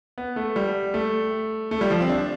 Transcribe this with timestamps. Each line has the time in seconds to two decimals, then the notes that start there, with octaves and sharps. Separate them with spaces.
0.18 B3
0.36 A3
0.56 G3
0.94 A3
1.71 A3
1.81 G3
1.91 F3
2.01 C4
2.10 D4